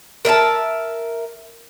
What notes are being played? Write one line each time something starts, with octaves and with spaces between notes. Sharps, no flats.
A#4 E5 G#5 A5